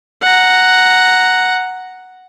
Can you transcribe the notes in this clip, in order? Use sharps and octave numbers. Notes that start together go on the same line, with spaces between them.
F#5 A#5